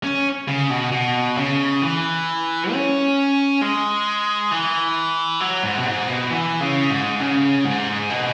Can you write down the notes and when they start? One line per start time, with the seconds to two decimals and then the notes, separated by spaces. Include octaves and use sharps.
0.04 C#4
0.48 C#3
0.70 B2
0.92 B2
1.38 C#3
1.82 E3
2.72 C#4
3.61 G#3
4.51 E3
5.40 F#3
5.63 G#2
5.77 B2
5.86 G#2
6.08 B2
6.30 E3
6.61 C#3
6.90 G#2
7.20 C#3
7.65 G#2
8.10 B2